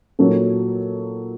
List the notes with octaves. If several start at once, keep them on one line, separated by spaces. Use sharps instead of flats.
A#2 F#3 A#3 D#4 A4